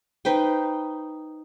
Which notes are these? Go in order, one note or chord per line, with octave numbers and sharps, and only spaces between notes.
D#4 B4 C5 G5